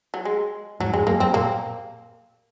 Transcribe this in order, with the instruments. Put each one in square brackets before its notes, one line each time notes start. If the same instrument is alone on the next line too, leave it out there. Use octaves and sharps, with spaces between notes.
[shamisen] F#3
G#3
[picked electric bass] F2 G#2 [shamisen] F#3
[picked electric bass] F2 G#2 [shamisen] G#3
[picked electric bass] F#2 [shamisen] A#3
[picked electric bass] F#2 [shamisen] C4
[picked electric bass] A#2 [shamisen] A#3